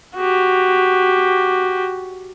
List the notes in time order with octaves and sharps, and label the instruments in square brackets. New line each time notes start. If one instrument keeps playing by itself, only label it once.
[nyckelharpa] F#4 G4